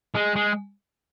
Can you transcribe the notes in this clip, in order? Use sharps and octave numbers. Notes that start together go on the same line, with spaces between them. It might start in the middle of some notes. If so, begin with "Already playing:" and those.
G#3
G#3